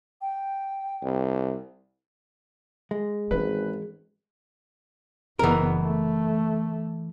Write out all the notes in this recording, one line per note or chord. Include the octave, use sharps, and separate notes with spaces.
G5
C2
G#3
G#1 E3 C#4 B4
F#1 E3 B3 A#4
A3